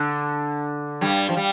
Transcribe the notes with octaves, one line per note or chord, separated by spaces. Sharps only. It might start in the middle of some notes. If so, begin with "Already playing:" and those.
Already playing: D3
G2 G3
F3
G3